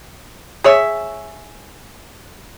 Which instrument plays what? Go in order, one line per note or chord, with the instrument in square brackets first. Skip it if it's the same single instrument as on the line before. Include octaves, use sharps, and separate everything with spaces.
[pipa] G#4 C#5 E5